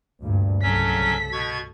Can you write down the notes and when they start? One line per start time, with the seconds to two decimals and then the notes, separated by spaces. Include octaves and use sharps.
0.21 D2 G2 A#2
0.62 C2 C#3 F#3 C#4 A4 B6
1.32 B2 C#6 G#6